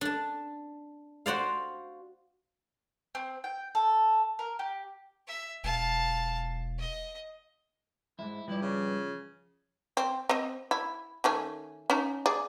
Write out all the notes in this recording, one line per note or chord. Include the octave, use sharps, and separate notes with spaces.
D4 A5
F#4 C5 D5 F5
C4
G5
A4
A#4
G4
E5
E1 F5 A5
D#5
F2 G#2 E4
G2 F3 E4 D5
C#3
C4
C4 D#5
E4
D#3 A3 C#4
C#4 D#4
G#4 D5